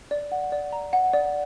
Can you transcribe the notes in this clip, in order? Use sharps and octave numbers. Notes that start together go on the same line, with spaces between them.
D5
F#5
D5
A#5
F#5
D5